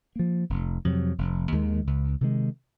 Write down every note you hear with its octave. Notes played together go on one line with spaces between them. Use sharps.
F3 A#3
F1
F2 C3 F#3
F1
D#2 D#3 G#3
C#2
C3 D#3 G#3